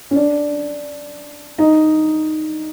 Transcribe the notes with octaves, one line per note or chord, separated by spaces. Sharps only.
C#4
D4
D#4